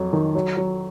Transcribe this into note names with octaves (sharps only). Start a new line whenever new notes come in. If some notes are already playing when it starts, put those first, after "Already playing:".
Already playing: F2 F#3
D#3
F#3
F#3